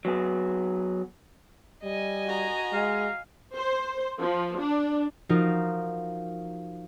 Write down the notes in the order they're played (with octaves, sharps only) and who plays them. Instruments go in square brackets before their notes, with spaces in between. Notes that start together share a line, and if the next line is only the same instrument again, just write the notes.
[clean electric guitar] F#3 B3 G#4
[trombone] G3 [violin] D#5 G#5
[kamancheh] F#4 A#5
[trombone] G#3 [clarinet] F5
[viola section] C5
F3
D4
[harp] F3 D#4 F4 F#4 A#4